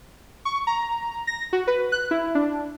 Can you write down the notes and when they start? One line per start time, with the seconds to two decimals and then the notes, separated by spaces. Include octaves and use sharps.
0.45 C#6
0.67 A#5
1.27 A#6
1.53 F#4
1.67 B4
1.92 F#6
2.11 E4
2.35 D4